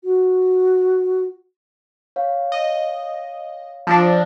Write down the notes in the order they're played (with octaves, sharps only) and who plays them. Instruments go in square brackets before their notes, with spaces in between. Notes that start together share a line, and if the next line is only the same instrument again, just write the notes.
[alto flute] F#4
[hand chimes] C#5 F5
[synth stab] D#5
[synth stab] F3 D4 [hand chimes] E6 A6 A#6